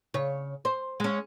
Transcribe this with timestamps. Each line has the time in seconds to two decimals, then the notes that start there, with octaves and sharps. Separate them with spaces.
0.14 C#3 C#5
0.65 C5
1.00 G#3 C#4